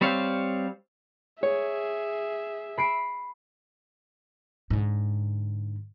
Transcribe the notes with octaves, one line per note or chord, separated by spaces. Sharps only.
G3 C4 C5 C#5 F5
G#4 C#5 E5
B5 C7 D7
G#2 D3